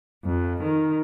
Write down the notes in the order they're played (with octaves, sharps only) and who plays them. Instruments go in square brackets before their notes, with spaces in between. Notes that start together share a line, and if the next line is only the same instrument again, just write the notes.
[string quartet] F2
D#3